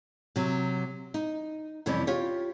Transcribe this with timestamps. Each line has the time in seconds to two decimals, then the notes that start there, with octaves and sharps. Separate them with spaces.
0.36 C3 F#3
1.14 D#4
1.86 F2 C3 E3 G3 C#4
2.07 F4 G4 C#5